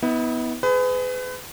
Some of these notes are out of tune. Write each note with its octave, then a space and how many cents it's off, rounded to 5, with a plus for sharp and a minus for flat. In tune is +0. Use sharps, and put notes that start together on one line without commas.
B3 +0 E4 -45
G#4 +10 B4 +35